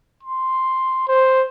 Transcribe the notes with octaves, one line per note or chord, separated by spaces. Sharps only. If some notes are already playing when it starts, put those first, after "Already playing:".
C6
C5